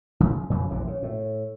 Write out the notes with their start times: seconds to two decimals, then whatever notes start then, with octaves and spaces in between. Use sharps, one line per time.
0.20 C#3 E3 F3
0.50 F2 C#3 F3 F#3
0.70 F1 A#1 C3 E3
0.87 C#3
1.03 A2